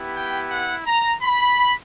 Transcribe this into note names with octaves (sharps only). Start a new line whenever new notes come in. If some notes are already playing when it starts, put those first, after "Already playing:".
Already playing: B3 E4 G4
G5
F#5
A#5
B5